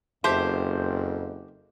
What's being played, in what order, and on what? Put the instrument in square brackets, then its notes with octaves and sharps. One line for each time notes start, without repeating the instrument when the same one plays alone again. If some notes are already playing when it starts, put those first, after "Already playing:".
[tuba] F#1 [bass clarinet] F2 [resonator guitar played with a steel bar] G4 E5 A5 [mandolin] C5